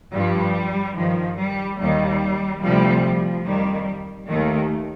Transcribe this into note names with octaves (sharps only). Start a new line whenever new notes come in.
G2 F3 G3
G2 D#3 F3
G3
D#2 D#3 G3
D2 C3 F3 G3
F3
F2 D#3 G3
D#2 D#3 A3